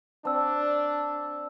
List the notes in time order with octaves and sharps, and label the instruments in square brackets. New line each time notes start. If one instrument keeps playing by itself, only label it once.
[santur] C4 D5 [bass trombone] D4 [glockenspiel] A5 E6